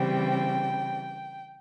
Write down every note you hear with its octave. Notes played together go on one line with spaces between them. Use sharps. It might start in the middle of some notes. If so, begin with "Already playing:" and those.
Already playing: C#3 E3 G3 C4 G5